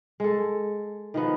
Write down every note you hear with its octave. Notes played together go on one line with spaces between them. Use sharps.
G#3 A4
D#3 F3 B3